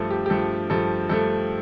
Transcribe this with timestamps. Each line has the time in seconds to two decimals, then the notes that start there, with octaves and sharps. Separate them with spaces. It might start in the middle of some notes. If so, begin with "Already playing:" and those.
Already playing: G2 F3 A3 A4
0.11 G4
0.26 G4
0.30 G2 F3 A3 A4
0.70 G2 F3 A3 A4
1.09 G2 F3 A3 A4